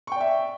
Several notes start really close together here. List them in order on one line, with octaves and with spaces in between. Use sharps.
C#6 G5 D5 E5